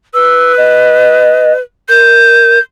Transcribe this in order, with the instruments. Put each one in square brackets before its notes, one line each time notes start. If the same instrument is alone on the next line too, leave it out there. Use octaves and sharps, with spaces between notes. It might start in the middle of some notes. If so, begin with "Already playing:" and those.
[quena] B4 [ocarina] E6
[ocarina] D#5
[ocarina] A#4 [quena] G6